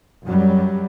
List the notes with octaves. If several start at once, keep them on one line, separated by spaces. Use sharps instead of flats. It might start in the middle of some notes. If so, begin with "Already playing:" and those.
F#2 F#3 G3